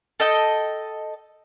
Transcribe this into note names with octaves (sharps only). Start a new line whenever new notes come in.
A4 D#5 G5